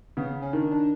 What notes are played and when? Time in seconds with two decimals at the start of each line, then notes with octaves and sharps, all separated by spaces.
0.17 C#3 B3
0.42 C#4
0.53 D#3 D4
0.71 D4